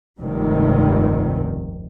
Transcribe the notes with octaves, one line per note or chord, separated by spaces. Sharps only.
F1 C#2 G2 C3 D#3